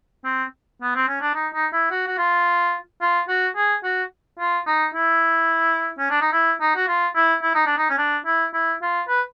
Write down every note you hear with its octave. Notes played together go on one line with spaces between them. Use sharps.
C4
B3
C4
C#4
D4
D#4
D#4
E4
F#4
F#4
F4
F4
F#4
G#4
F#4
F4
D#4
E4
C#4
D4
D#4
E4
D#4
F#4
F4
E4
E4
D#4
D4
D#4
C#4
D4
E4
E4
F4
B4